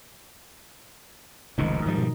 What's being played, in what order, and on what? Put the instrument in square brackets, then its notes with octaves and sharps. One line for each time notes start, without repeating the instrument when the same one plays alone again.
[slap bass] F1 C#2 G#2 [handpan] D#3 D#4
[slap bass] G#2 F3 G3
[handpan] B2